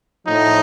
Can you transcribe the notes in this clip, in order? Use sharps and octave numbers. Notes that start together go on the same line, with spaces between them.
A2 F3 D#4